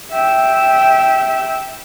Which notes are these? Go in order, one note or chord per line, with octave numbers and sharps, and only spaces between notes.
E5 G5